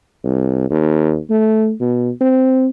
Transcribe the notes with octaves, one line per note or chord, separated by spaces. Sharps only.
C2
D#2
A3
B2
C4